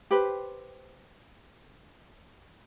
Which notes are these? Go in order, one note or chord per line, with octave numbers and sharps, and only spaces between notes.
G4 B4 C5